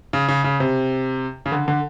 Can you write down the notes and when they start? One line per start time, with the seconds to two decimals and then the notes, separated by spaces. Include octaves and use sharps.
0.13 C#3
0.28 C#3
0.44 C#3
0.60 C3
1.46 C#3
1.52 D3
1.68 D3